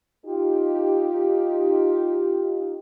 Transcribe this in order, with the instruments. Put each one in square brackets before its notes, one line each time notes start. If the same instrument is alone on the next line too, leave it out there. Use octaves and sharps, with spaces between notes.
[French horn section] D#4 F4 G4